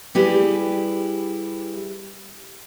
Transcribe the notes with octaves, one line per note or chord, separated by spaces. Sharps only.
G3 E4 G4 G#4 B4